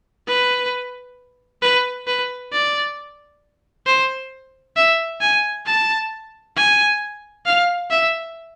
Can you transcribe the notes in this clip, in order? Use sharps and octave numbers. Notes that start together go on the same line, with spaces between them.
B4
B4
B4
D5
C5
E5
G#5
A5
G#5
F5
E5